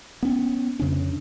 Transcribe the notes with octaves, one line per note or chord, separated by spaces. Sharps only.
B3 C#4
F2 C#3 C#4 D4